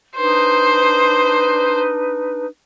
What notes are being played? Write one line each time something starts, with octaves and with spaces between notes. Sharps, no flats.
D4 D#4 B4 C5